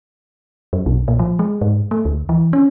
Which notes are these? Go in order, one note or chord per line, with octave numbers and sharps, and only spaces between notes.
F#2
B1
A#2
F3
G#3
G#2
A3
D2
E3
C#4